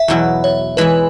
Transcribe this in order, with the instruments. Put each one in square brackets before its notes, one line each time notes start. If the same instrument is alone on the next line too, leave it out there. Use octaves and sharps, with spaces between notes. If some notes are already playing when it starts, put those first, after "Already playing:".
Already playing: [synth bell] E5
[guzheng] E2 B2 F#3 E4
[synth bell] C#5
[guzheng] E3 G#3 E4 [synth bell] B4